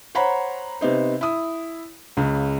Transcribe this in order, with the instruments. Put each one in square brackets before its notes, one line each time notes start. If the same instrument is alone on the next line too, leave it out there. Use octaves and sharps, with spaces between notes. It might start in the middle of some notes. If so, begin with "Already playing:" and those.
[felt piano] C5 C#5 F#5 A#5 B5
C3 B3 D#4 C5
E4 D#6
C#2 C#3